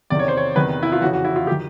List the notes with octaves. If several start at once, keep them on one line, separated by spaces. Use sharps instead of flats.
E2 C3 D#3 D5
C#5
C5
C#5
E2 C3 D#3 B4
E4
F4
F2 C#3 E3 F#4
F#4
E4
F4
G4
D#3